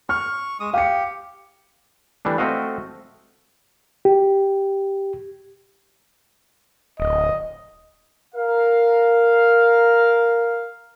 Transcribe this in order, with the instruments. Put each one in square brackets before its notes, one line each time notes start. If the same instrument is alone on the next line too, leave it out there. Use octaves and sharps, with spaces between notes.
[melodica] C#6 [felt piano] F6
[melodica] G#3 D#6
[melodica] G4 [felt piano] F5 C#7
[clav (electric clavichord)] E3 G3 A3 D4
A3 C4 F#4 D#5 F5
[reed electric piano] G4
[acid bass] D1 [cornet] D#5
[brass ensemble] A#4 F5